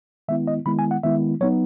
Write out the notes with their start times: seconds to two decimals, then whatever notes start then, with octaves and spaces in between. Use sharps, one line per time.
0.28 D#3 G#3 B3 E4 E5
0.47 D#5
0.66 D#3 G#3 B3 E4 B5
0.79 G#5
0.91 F#5
1.03 D#3 G#3 B3 E4 E5
1.41 F#3 B3 D#4 C#5